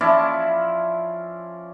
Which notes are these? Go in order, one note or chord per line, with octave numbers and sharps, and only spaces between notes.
F3 C#4 E4 D5